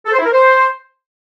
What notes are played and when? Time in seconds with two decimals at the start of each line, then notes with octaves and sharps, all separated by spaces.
0.05 A4
0.12 C5
0.19 E4
0.25 A#4
0.32 C5